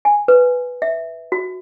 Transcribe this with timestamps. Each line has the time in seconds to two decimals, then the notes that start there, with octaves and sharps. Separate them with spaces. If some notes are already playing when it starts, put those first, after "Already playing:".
0.05 G#5
0.28 B4
0.82 E5
1.32 F#4